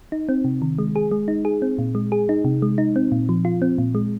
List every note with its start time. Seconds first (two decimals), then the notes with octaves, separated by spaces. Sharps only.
0.12 D#4
0.29 C4
0.45 C3
0.62 D#3
0.78 G#3
0.96 G#4
1.11 G#3
1.28 D#4
1.45 G#4
1.62 C4
1.78 A#2
1.95 G#3
2.12 G#4
2.29 D#4
2.45 C3
2.62 G#3
2.78 D#4
2.96 C4
3.12 A#2
3.29 F3
3.45 F4
3.62 C4
3.78 A#2
3.95 G#3